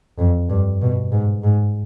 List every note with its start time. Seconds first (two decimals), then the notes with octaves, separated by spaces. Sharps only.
0.18 F2
0.49 G2
0.81 B2
1.12 G#2
1.43 G#2